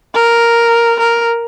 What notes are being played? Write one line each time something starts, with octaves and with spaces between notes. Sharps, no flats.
A#4
A#4